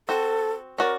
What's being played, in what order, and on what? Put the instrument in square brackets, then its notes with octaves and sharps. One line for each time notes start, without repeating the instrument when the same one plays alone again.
[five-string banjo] C4 F#4 [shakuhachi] A4
[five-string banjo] C#4 F#4 D5 [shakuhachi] A#4